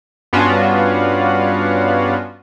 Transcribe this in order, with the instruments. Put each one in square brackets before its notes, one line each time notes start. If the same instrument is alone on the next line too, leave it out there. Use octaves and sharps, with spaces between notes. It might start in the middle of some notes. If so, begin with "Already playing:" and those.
[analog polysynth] G2 B3 C#4 D4 F4 F#4